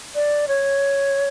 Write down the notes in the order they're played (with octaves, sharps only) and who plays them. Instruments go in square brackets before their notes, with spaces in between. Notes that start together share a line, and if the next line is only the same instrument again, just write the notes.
[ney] D5
C#5